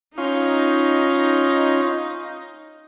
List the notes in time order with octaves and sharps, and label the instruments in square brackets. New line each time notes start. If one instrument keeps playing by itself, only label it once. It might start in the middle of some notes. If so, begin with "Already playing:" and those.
[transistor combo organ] C#4 F4 [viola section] D#4